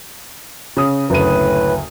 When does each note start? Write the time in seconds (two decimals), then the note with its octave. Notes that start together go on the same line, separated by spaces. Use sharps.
0.77 C#3 D#6
1.10 F#1 D2 A2 B4 D#7